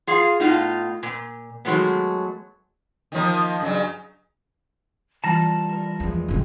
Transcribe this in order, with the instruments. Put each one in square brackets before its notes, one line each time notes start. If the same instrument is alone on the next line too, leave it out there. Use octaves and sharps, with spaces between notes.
[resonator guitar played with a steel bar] F4 G#4 F5
A2 B3 D#4 F4 F5
A#2
D#3 F#3 G#3 A3 B3
[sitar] D#3 F3 A#3
G2 C#3 F#3
[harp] E3 F4 [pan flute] G3 [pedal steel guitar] A5 A#5
[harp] A#4
[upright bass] E2 [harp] F3 G#3
[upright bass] C#2 A2